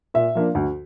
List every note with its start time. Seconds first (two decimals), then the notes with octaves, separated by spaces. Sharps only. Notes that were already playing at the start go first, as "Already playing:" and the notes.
0.14 A#2 E5
0.35 F3 A#3 D4
0.55 D2